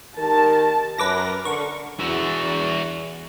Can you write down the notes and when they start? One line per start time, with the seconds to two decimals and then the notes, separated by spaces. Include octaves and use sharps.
0.19 D#3 G4 A#4 A5
0.98 F#2 A#4 B4 D6 A#6
1.45 D3 C#6
2.00 E2 F#4 E5